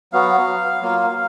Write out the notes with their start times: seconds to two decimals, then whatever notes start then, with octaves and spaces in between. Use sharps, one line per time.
0.13 F#3 B3 F#4 F5
0.82 F#3 A#3 F4